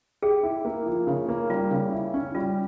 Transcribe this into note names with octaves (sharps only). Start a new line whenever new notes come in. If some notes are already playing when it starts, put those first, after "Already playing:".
G4 G#4
E4
A#3
F3
C#3
A#3
G3 F4
C#3
E4
C#4
G3 F4